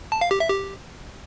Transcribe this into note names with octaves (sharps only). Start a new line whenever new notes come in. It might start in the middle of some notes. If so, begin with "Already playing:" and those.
A5
F5
G4
E5
G4